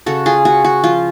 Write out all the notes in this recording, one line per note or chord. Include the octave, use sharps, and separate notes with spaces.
C#3 F#4 A4
F4 G#4
F4 F#4
F#4
F3 F4